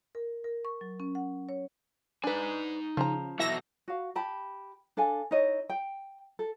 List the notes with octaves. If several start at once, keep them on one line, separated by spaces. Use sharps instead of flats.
A#4
A#4
C#6
F#3
C#4
F#5
C#5
D4 D#4 B4 G#5
C#3 F3 A#5
B2 E3 F#3 A4 E5 A#6
F#4 F5
G4 A5 B5
D4 A4 F5 G#5
D#4 E4 C#5 D#5
G5
A4